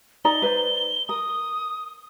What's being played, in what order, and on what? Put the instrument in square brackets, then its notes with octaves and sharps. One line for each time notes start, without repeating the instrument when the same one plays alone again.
[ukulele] D#4 D5 A#5 [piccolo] G7
[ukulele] B4 C5 D5
[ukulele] A#4 [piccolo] D#6